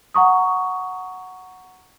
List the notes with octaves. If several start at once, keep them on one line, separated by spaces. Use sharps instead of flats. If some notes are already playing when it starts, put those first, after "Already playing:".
F#5 A#5 C#6 D#6